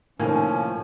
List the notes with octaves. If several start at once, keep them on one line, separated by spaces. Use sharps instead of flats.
A2 C3 D#3 F3 A#3 C#4 G#5